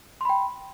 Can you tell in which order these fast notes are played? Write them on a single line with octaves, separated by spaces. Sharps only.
C6 B5 G5